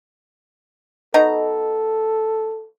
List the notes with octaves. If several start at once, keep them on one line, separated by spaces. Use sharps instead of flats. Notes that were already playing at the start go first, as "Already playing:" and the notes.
B2 D#4 A4 A#5